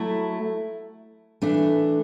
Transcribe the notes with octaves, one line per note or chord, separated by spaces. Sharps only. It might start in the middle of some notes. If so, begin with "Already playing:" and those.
Already playing: F#3 A3 E4
E3 A3 D4